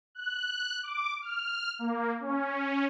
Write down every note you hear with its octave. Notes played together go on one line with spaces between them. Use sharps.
F#6
D6
F6
A#3
C#4